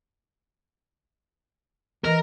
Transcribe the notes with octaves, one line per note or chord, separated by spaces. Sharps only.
E3 A#4 D#5